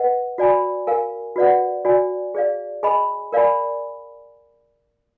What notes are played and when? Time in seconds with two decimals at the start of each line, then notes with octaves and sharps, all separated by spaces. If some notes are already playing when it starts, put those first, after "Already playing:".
Already playing: B4 D#5 F#5
0.38 F#4 D5 G#5 B5
0.87 A#4 F5 G#5
1.36 F#4 B4 D5 F#5
1.85 F#4 D5 G#5
2.35 G#4 D5 F5
2.83 G#4 D#5 G#5 B5
3.33 A#4 D5 F5 G#5 B5